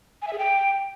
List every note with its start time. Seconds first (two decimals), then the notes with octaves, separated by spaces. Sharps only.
0.22 G#5
0.27 E5
0.33 G#4
0.38 G5